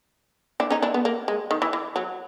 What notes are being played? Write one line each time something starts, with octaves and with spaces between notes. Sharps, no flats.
D4 E4
C#4 D#4
D4 E4
B3
A#3
G#3
D#3
E3
E3
F#3